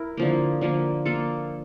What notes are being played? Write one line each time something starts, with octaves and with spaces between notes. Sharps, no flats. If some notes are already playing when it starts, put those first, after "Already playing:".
Already playing: E4 A#4
D3 F3 A#3
D3 F3 A#3
A#3 F4 A4